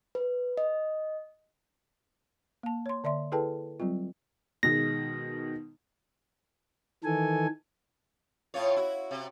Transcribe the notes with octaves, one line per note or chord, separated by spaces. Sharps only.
B4
D#5
A#3 A5
C#5 C6
D3 D5 E5 C6
E4 G#4 A4 B4 G5 A5
F#3 G3 C4 F4
B2 D#3 G#3 A#6
D#3 E3 A4 G#5
A2 F4 C#5
E4 F#4
C3